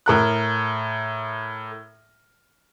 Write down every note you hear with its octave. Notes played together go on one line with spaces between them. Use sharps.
A2 A#4 F#6